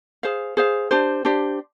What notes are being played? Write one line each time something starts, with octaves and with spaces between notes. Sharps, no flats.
G#4 C5 F5
G#4 C5 F5
D4 G4 C5
D4 G4 C5